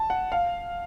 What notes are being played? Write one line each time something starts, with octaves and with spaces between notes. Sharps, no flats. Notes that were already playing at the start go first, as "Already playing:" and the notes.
Already playing: A5
F#5
F5